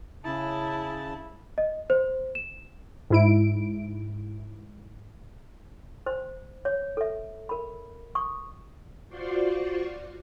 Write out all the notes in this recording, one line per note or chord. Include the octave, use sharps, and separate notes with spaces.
C#3 E4 A5
D#5
C5
E7
G#2 E4 D7
C5
C#5
A4 E5
A#4 B5
C#6 D#6
F4 F#4 C5 D5 C6 C#6